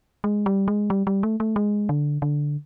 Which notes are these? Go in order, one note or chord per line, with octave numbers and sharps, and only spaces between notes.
G#3
G3
G#3
G3
G3
A3
A3
G#3
D3
D3